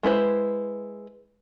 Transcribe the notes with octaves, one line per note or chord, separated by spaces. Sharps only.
G#3 E4 B4 C5